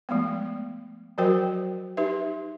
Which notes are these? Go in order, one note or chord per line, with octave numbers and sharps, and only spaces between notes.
F3 G#3 A3 B3
F3 F#3 F#4 A#4 C5 G5
D#4 G4 B4 E5